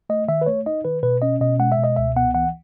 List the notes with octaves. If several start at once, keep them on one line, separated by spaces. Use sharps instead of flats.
A3 D#5
D#3 E5
B4
A3 C#5
D#4 D#5
D#3 B4
B2 B4
C#4 D#5
B2 D#5
G#3 F#5
E5
B2
D#5
C#2 E5
B3 F#5
E3 F#5